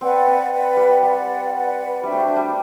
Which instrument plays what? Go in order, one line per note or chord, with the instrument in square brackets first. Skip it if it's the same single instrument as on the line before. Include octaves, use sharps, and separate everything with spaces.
[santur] C4 [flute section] B4 D5 F#5
[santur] C4
[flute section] B4 D5 F#5
[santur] G3
[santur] G3 [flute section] B4 D5 F#5
[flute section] B4 D5 F#5
[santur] G3 [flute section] D4 F#4 C5 E5
[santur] A3
G3
A3
G3